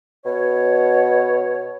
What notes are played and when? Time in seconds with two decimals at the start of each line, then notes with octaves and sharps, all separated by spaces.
0.25 B2 C#5